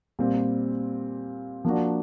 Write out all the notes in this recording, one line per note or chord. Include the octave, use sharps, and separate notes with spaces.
A#2 G3 C4
F3 A#3 D4 F#4